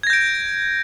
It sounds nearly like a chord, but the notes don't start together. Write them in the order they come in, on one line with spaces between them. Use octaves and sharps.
G#6 A#6 G6 D7